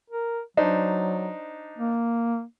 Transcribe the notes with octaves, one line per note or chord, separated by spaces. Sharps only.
A#4
F#3 D4 D#4 C5
A#3